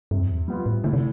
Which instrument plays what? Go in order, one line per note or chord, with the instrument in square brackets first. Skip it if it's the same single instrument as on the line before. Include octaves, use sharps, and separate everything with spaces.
[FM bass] G2 [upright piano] C3
[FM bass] F2
E2
[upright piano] G3 B3 F4
[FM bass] A2
[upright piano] A2 [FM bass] D3
[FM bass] C3